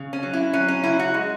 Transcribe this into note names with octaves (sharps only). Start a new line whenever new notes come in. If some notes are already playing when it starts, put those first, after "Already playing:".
Already playing: C#3
C#4
F#3
E4
F#3 C#4
C#4
C#3 E4
F#4
G#3